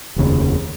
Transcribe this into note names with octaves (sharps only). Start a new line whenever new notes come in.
F1 D#2 C#3